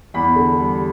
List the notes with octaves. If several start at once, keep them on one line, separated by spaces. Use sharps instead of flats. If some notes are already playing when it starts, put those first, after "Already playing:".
E2 B5
D3
G3